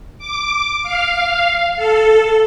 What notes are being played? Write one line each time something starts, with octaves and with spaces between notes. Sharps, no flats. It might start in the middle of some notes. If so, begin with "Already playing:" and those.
D6
F5
A4